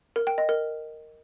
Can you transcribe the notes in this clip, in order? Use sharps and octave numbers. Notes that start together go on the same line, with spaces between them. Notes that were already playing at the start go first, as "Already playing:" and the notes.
A#4
G5
D#5
A#4